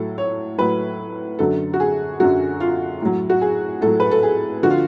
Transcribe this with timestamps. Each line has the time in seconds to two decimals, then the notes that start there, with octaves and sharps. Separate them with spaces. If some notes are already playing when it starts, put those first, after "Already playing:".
Already playing: A2 F#3 A4
0.18 C#5
0.58 A2 F#3 B4
1.39 F#2 D3 F#3 A4
1.74 F#4
1.80 G#4
2.20 F#2 D3 F#3 F#4
2.60 F4
3.01 A2 F#3
3.30 F#4
3.41 G#4
3.81 A2 F#3 A4
4.00 B4
4.12 A4
4.23 G#4
4.63 D3 F3 F#4
4.70 F4